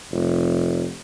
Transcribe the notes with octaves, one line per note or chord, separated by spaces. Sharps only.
F1